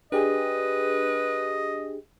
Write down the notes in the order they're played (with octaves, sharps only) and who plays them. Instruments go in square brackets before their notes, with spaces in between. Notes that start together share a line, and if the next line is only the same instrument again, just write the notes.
[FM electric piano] D4 G4 G#4 [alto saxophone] B4 [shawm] D#5